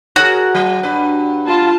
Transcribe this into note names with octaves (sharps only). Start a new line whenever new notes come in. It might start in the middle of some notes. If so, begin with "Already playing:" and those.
F#4 G#4 A#4 C#5
F#3
G2 D4 B4
F4 A5